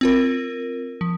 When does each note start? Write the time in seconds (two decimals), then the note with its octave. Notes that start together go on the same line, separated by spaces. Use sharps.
0.01 C4 F4 A#4
1.01 F3